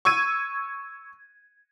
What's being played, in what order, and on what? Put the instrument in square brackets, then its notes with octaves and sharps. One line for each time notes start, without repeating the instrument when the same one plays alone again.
[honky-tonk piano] C#6 E6 G#6 D#7